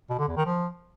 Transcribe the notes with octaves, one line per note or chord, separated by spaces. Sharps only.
B2
D3
E2
D#3
F3